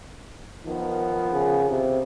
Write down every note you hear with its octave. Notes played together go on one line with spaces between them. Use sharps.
D#3 F3 B3
C#3
C3